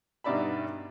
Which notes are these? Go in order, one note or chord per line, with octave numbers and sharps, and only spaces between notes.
G2 B2 D#4 D5 E5 B5